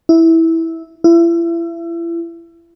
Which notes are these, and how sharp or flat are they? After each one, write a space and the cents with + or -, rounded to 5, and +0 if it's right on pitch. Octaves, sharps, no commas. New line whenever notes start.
E4 -10
E4 +35